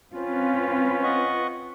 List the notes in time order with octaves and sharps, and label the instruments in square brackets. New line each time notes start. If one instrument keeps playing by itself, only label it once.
[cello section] C4 F4 B4 [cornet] C#4
[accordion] D#5 F#5 C#6